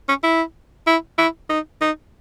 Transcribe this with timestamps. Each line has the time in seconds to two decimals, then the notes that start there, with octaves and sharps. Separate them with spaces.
0.09 C#4
0.23 E4
0.87 E4
1.18 E4
1.50 D#4
1.81 D#4